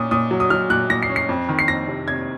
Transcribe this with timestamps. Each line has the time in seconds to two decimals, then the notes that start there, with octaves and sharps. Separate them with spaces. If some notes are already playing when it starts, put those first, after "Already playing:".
Already playing: A#2 C#4 D#6
0.11 A#2 D#6
0.31 F#3
0.40 D#6
0.50 F#3 F6
0.70 A#2 F#6
0.90 A#2 A#6
1.03 C7
1.10 C#4
1.16 C7
1.29 F2
1.49 D#3
1.59 C7
1.68 F2 A#6
1.88 C3
2.08 C3 G#6